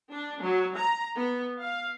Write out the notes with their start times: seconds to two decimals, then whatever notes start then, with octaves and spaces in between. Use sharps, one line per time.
0.12 D4
0.42 F#3
0.77 A#5
1.15 B3
1.60 F5